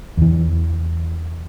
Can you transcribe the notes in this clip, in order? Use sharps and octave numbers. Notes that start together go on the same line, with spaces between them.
E2 E3